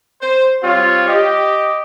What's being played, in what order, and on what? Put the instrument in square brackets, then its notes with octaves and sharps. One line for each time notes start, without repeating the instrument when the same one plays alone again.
[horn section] C5
[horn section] G3 C4 C#5 [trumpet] F4
[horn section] G4 [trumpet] D#5